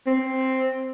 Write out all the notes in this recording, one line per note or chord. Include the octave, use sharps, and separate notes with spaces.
C4